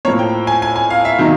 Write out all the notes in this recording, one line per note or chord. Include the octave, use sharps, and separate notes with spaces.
A2 F3 A#3 C#5
G5
G#5
G#5
G#5
F5
E5
D#3 F#3 A#3 D#4